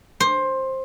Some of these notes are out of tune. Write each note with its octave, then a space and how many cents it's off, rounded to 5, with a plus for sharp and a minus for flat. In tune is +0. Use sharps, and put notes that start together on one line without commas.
C5 +15